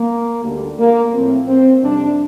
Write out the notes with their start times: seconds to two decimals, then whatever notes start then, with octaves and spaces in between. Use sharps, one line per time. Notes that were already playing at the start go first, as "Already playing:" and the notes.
Already playing: A#3
0.43 D2 D3 G3
0.78 A#3
1.13 A2 F3 C4
1.48 C4
1.83 F2 C3 G3 D4